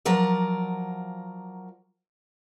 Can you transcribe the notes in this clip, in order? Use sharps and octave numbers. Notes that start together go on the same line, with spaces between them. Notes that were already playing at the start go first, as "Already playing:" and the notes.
F3 F#3 A#4 D5